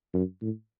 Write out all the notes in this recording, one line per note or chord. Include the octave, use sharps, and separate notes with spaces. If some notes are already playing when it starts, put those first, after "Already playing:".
F#2
A2